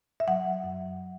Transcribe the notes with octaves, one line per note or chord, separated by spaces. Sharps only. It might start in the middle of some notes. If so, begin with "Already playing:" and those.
E5
F#3 F#5
F#2